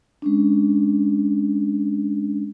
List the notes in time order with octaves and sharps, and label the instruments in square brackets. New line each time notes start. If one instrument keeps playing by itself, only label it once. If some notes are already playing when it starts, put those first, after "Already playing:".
[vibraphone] G#3 C#4 D4